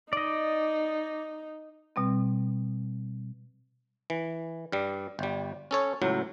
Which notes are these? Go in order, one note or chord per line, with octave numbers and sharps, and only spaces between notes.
D#4 D5 D#5
B2 G3 C4
E3
G2 G3
G1 G3
C#4 A4 C#5
C#2 A2 F#3